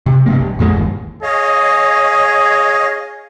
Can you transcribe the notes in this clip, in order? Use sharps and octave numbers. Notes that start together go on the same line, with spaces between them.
C3
G2 C3 A#3
A#1
F2 A#2 F3 G#3
G1 D#2
G#4 C#5 D#5 F5